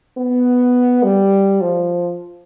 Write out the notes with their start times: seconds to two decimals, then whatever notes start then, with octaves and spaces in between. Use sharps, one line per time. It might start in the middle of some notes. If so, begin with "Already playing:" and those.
0.17 B3
1.03 G3
1.61 F3